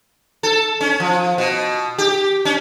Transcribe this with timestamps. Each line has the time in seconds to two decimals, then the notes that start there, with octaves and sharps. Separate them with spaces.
0.43 A4
0.81 C#4
1.00 F3
1.38 B2
1.98 G4
2.45 C#4